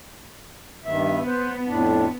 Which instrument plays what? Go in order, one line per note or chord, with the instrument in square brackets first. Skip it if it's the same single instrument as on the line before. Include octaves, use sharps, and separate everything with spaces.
[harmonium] G2 D#3 E5 [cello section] B3
[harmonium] B4 C5
F2 A2 D4